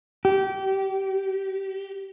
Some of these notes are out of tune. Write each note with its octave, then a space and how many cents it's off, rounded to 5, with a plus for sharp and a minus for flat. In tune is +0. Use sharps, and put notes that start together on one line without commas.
G4 -25